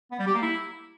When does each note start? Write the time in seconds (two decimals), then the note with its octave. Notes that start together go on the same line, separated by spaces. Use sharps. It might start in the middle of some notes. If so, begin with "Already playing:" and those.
0.12 B3
0.19 G3
0.27 G4
0.35 A#3
0.42 E4